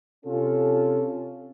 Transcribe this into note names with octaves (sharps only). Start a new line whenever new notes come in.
C3 C#4 F4 A4